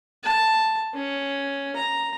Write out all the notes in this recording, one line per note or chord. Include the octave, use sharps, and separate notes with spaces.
A5
C#4
A#5